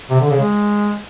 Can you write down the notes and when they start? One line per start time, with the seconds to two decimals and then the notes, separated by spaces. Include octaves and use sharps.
0.10 C3
0.20 D3
0.30 C#3
0.40 G#3